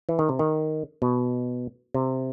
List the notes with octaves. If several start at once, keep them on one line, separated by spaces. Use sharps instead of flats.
E3
D#3
C3
D#3
B2
C3